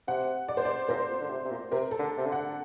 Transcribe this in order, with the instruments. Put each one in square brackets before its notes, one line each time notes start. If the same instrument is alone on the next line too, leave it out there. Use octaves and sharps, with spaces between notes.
[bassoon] C3 [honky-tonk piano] F#5
[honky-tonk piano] D5
C5
D5
[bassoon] A#2 [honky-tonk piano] C5
[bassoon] A#2
D3
C3
C3
A#2
[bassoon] C3 [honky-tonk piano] A#4
[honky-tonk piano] A4
[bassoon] D3
C3
D3
[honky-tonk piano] F#5